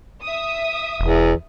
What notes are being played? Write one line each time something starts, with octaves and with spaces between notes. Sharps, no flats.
E5 D#6
E1 E2